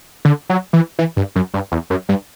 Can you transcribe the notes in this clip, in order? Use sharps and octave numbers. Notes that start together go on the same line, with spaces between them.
D3
F#3
E3
E3
G2
F#2
G2
E2
F#2
G2